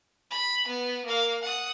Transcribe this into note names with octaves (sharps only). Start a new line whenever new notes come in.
B5
B3
A#3 F5
F#5 D#6